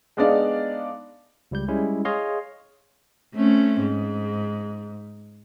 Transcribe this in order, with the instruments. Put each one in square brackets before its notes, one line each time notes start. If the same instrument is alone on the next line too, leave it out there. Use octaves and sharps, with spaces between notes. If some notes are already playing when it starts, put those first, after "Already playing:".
[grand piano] G#3 B3 D4 D#4 D5 F5
[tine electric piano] C#2 G3 G6
G3 G#3 C#4 E4
G#4 C#5 D#5 F5 C6
[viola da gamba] A3 C4 C#4
G#2